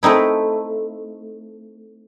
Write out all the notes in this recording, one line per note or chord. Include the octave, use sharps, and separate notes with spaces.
A3 C4 D#4 E4